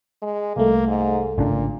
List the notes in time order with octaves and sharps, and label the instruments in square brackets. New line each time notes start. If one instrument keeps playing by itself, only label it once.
[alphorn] G#3
[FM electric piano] C2 A3 [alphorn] A#3
[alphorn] G#2
[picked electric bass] G#1 C#3 D4 [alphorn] A#2